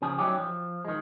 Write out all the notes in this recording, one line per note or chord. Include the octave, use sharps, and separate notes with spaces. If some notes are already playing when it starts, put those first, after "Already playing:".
C#3 F3 G#4
F#3 G3 A3 C#4 D#4 G4
F3
D#3 G#3